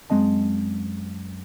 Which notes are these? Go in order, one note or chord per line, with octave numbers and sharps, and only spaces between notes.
F#2 G#3 C4 D#5 A5